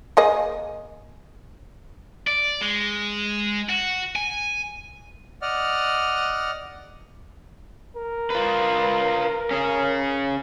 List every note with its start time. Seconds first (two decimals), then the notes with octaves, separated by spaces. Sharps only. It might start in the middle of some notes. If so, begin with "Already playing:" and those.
0.17 A#3 G#4 D#5
2.27 D5
2.62 G#3
3.69 F#4
4.16 G#5
5.42 D5 D#5 F#5 F6
7.97 A#4
8.30 F4 B4
9.51 C#4 G#4